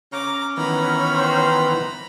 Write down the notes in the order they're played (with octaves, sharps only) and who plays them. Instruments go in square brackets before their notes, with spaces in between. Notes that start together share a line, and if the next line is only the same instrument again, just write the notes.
[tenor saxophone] C#4 [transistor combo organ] A#5 [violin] D6
[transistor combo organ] D#3 E3 B3 [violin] A#5 B5
[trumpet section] C5 G5 C6